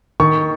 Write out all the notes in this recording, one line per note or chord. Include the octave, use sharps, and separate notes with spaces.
D#3 C#6